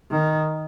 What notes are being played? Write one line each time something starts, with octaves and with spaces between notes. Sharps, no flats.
D#3